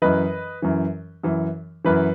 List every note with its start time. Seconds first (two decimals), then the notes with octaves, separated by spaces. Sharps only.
0.02 F#2 E3 B4 D#5
0.62 F#2 E3
1.23 F#2 E3
1.85 F#2 E3 B4